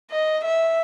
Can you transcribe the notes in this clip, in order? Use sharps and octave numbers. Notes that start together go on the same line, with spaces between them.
D#5
E5